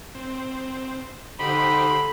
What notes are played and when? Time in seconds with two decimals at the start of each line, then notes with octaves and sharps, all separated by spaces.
0.15 C4
1.39 D3 D#4 G4 C5 B5